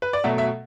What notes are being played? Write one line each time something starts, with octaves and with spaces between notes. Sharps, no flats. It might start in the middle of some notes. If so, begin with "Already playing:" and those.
B4
D5
B2 F#3 A3 E5
E5